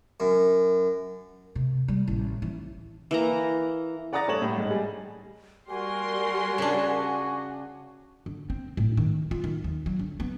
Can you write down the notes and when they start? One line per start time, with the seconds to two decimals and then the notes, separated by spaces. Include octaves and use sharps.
0.20 F#2
1.55 C3
1.88 G3
2.08 A1
2.42 E3
3.11 E3 A#3 A#5
4.13 D5 F#5 A#5 D#6 A6 A#6
4.27 G2 A3 C#5 E7 F#7
4.42 A2 G3
4.58 G#2
4.71 G3 G#4
5.69 G3 F#4 A#4 G#5 C6
6.58 C#3 D4
8.26 D3
8.50 C4
8.77 A2
8.97 D#3
9.31 F4
9.44 D#3
9.64 D#2
9.86 F#3
9.99 D3
10.20 B3